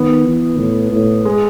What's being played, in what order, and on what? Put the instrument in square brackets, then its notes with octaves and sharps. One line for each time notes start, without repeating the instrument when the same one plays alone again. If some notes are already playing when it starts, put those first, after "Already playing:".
Already playing: [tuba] D#3 [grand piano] B3
[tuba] E3
A2
A2
[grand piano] G#3